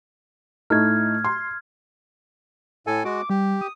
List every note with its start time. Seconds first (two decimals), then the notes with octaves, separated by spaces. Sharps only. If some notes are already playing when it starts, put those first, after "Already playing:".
0.70 A2 A3 D#4 F6 G#6
1.24 C6
2.87 A2 A4 G#5
3.05 G#3 F#4 D6
3.30 G3 G4
3.61 D#6